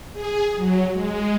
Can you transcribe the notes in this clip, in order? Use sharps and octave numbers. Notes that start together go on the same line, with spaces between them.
G#4
F#3
G#3